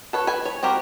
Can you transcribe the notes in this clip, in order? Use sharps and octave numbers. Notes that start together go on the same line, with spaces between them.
A4 B4 C#5
B4 G#5
C#5
C4 F#4 G4 A#4